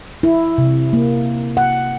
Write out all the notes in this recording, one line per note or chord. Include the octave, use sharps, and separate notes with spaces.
E4
C3
A#3
F#5